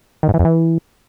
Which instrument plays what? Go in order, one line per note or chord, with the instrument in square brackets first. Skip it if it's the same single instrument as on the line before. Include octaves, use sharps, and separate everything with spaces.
[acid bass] D#3
G#2
E3
F2
E3